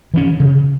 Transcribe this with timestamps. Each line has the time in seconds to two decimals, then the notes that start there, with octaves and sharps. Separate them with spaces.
0.14 E3 A3 C#4
0.40 C#3